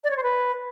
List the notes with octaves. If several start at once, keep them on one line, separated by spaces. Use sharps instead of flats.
D5
C#5
C5
B4